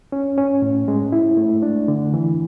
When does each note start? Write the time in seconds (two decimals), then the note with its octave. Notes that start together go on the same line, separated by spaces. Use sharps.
0.12 C#4
0.38 C#4
0.62 A2
0.88 G#3
1.12 E4
1.37 A3
1.62 D4
1.88 D3
2.14 E3